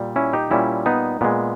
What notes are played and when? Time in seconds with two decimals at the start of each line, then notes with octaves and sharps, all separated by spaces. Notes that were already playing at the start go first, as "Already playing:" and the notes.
Already playing: A#2 G3
0.16 C#4 E4
0.33 D#4 G4
0.51 A#2 G3 C#4 E4
0.86 B3 D#4
1.21 A#2 G#3 B3